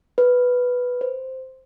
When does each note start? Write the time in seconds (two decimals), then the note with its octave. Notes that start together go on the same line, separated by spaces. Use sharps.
0.18 B4
1.01 C5